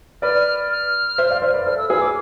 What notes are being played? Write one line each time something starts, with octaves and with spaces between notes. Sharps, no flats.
B4 D5 F6
F6
C5 E5
D5 F5
C5 E5
B4 D5
A4 C5 F6
E6
G#4 B4 E6
D6